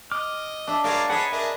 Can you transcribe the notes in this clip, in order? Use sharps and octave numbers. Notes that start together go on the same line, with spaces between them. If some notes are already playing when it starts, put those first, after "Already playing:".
D#5 D6 F6
D4 E5
F#3 G#3 A#4 D5 F5 G#5
G#4 B4 C#5 D#5 F#5 A5
D4 G#4 A#4 E5